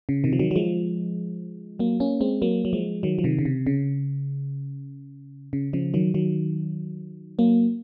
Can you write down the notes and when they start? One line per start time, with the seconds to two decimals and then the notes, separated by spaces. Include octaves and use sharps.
0.09 C#3
0.24 C3 D#3
0.33 F3
0.39 D#3 F#3
0.51 F#3
0.56 F3 G#3
1.79 F#3 A#3
2.00 A#3 C#4
2.21 G#3 C4
2.42 F#3 A#3
2.65 F#3
2.73 F3 G#3
3.03 D#3 F#3
3.19 F3
3.24 C3 D#3
3.39 C#3
3.45 C3
3.67 C#3
5.53 C#3
5.73 C#3 F3
5.94 D#3 F#3
6.14 D#3 F#3
7.39 F#3 A#3